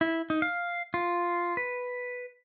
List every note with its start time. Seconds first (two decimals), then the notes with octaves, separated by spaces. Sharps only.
0.01 E4
0.30 D#4
0.42 F5
0.94 F4
1.57 B4